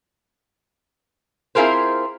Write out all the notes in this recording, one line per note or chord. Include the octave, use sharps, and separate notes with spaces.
C4 E4 F4 G#4 A#4 C5